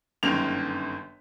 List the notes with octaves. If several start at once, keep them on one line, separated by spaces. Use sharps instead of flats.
G1 F#2 D#3 A#3 F7